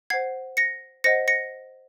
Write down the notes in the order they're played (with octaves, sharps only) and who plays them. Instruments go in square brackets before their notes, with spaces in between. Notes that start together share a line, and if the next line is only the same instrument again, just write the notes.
[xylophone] C5 F#5 G#6 C7
A#6 C#7
C5 D#5 F#5 A#6 C#7
A#6 C#7